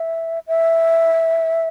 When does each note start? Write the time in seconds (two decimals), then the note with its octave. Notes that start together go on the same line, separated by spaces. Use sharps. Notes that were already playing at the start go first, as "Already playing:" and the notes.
Already playing: E5
0.48 E5